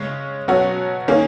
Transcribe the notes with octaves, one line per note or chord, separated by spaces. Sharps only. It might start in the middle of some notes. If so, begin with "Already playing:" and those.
Already playing: C#3 G#3 C#4
B2 F#3 C#4 F#4
D#3 A#3 C#4 G#4